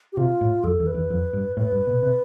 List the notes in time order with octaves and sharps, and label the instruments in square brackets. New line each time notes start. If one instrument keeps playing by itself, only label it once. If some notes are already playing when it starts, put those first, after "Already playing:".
[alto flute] G4
[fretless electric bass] C3 [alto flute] F4
[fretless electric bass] A2
[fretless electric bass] F2 [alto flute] A4
[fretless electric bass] E2
[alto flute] B4
[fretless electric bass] E2
F2
G2
[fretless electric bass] A2 [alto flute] B4
[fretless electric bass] G2
B2
C3